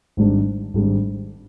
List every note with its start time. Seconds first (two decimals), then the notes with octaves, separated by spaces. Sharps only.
0.17 G#1 G#2 G3 D4
0.74 G#1 G#2 G3 D4